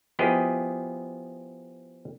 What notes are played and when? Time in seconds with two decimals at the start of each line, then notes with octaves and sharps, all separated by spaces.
0.19 F3 B3 E4 G4 G#4 D#5